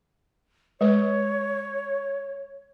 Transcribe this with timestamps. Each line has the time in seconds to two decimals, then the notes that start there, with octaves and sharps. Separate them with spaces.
0.81 G#3 B4 C#5